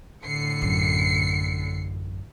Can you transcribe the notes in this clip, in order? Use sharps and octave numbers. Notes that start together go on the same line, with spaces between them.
A2 D3 C7 C#7
A1 F#2